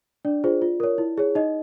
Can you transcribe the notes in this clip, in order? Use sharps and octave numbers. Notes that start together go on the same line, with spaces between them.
D4 D5
F4 G#4 C5
F4
A#4 C#5
E4
G#4 C#5
D#4 D#5